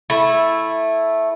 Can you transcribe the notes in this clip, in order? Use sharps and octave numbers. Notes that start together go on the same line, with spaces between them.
A3 E4